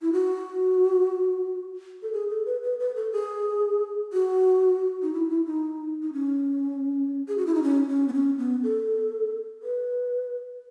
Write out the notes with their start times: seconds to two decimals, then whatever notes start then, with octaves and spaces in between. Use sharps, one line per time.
0.02 E4
0.13 F#4
2.03 A4
2.13 G#4
2.30 A4
2.46 B4
2.63 B4
2.80 B4
2.96 A4
3.12 G#4
4.13 F#4
5.02 D#4
5.13 E4
5.29 E4
5.46 D#4
6.02 D#4
6.13 C#4
7.28 G#4
7.38 F#4
7.46 E4
7.54 D#4
7.63 C#4
7.88 C#4
8.08 B3
8.13 C#4
8.38 B3
8.63 A4
9.63 B4